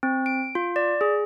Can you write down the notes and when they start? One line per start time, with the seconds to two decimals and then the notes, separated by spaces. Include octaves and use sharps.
0.03 C4
0.26 D7
0.55 F4
0.76 D5
1.01 G#4